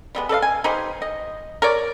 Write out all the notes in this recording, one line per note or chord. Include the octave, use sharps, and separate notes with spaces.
G3 G#3 B3
A4 B4 D5 F5
G#5
D#4 G4 B4 C5
D#5
A#4 C#5 D5